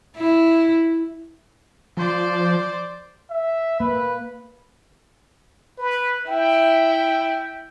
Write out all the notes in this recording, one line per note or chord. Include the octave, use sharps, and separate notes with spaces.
E4
F3 C5 D5
E5
A#3 B4
B4
E4 G5